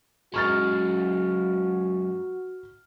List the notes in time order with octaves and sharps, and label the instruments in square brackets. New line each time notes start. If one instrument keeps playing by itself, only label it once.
[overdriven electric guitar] F#2 G#3 [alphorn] F#4 [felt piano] C#6 F6 A6